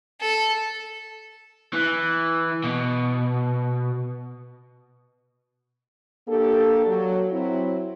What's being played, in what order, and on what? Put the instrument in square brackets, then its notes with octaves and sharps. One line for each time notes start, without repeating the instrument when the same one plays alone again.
[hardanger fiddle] A4
[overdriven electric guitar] E3
B2
[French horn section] A#3 D4 G4 A4
F#3
F#3 C4 E4